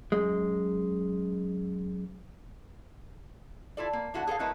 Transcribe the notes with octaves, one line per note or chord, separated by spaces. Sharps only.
F#2 G#3
E4 F4 A4 D5
A#3
D3 E4 F#4 A4 A#4 F#5
G#4 A4 B4 F5
F#3 A3 E4 A#4 B4 D#5